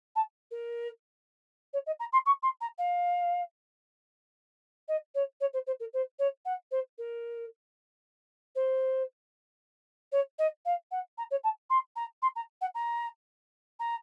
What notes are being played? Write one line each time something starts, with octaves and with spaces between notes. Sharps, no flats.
A5
A#4
C#5
D#5
A#5
C6
C#6
C6
A#5
F5
D#5
C#5
C#5
C5
C5
A#4
C5
C#5
F#5
C5
A#4
C5
C#5
D#5
F5
F#5
A#5
C#5
A5
C6
A#5
C6
A#5
F#5
A#5
A#5